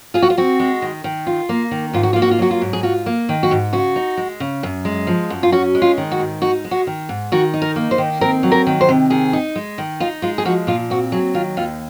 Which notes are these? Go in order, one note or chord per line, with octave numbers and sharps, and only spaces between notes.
F4 G#4
F#4
F4
C4 F#4
G#3
D#3
D#3
F4
A#3
D#3
G#2 F4
F#4
A#3 F4
F#4
F4
F#3 F#4
F4
G#2
G#4
F4 F#4
A#3
D#3
F#4
G#2
C#3 F#4
D#4
G#3
C#3
F#2
G#3
F3
F#2
F4
C#4 F#4
G#3
F4
D#3
F#4
G#2
D#4 F#4
G#3
F#4
D#3
G#2
D#3 F#4
D#4
A#4
A#3
C5
D#3
C4 A#4
F#3
A#4
D#3
C5
C3
D#3 G#4
D#4
G#3
D#3
D#4 F4
G#3 F4
G#4
F3 F#4
A#2 F4
C4 F#4
F#3 G#4
D#3 F4
D#2 F4